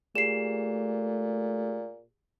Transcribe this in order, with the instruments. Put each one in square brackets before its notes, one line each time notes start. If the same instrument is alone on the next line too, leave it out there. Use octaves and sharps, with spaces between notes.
[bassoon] A#2 [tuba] A3 [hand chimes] G4 G#4 [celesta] C7 E7